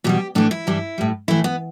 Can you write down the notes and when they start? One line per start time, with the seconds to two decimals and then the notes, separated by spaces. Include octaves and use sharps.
0.04 E2 B2 G3 G4
0.35 A2 E3 A3 D4
0.51 E4
0.67 G2 E3 G3
0.98 A2 G3
1.28 A2 E3 A3 E4
1.44 B3